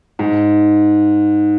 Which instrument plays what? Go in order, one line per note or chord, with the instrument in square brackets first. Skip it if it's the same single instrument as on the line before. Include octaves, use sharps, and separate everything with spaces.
[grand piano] G#2